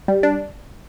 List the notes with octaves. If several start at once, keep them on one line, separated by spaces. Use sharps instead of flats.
G3
D4